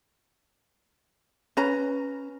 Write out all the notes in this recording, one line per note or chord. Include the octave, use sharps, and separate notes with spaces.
C#4 B4 A#5